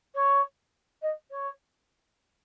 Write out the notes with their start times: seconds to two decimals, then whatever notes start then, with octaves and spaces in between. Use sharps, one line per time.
0.14 C#5
1.02 D#5
1.30 C#5